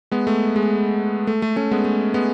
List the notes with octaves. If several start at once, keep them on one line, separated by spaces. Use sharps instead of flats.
G#3 B3
A3
G#3
A3
A3
A3 C#4
G#3 B3
A3
G#3 B3